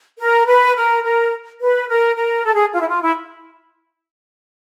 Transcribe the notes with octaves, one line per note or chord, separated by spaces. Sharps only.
A#4
B4
A#4
A#4
B4
A#4
A#4
A4
G#4
F4
E4
F4
E4